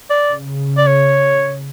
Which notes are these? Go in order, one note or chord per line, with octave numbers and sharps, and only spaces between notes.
D5
C#3
D5
C#5